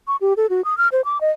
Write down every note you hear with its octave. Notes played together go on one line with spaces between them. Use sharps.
C#6
G4
A4
F#4
D#6
F6
C5
D6
D#5